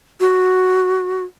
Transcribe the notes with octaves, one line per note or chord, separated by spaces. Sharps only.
F#4